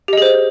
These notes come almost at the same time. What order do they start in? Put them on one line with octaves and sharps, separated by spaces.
G4 D#5 G#4 C5